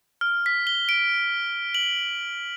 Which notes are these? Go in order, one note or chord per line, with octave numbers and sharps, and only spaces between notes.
F6
B6
G7
D7
F#7